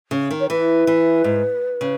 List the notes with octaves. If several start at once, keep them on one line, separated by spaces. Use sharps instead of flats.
C#3
D#3
C#5
E3 B4
E3
G#2
C#3